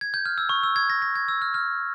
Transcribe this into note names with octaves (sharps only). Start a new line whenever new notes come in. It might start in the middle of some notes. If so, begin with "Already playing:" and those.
G#6
G6
F6
E6
C#6
E6
G#6
A#6
A#6
G#6
E6
F6
F6